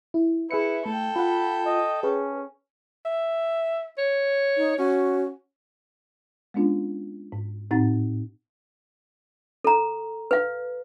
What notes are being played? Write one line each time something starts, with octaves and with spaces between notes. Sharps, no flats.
E4
E4 G#4 B4 E5 C#7
A3 A4 G5
F4 F#5 B5
D#5
C#4 G#4 B4
E5
C#5
D#4
C#4 F#4
G#3 B3 C#4 D4 F4
G#2
A2 C4 D#4 F#5 A6
A4 A#5
B4 F5